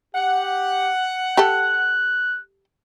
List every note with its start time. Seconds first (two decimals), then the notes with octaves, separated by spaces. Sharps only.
0.15 G4 F#5
1.37 G4 A4 F#6